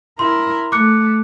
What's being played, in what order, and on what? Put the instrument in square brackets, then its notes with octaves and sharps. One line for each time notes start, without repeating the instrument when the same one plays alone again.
[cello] E4 A#4 [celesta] C6
[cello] A3 [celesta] D6 F#6 C#7